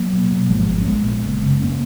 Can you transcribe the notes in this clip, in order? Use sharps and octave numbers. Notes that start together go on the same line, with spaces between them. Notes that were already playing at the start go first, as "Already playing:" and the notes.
Already playing: F#3 A#3
B2
B2
G#1 F3 G#3
G#1
C#4
A#1 G#3 B3
A#2
F#1
C#3
A#3 C#4